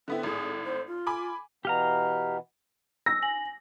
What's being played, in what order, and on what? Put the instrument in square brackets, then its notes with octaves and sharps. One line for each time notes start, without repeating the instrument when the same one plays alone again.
[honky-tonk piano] D3 B3 E4 [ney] C4
[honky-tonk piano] G#1 A2 [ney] G#4
[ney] C5
F4
[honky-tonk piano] G#5 B5 D6
[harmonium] B2 E3 B3 [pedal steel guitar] G4 F5 A#5
[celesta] E6 [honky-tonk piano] A#6
[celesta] G#5 F#7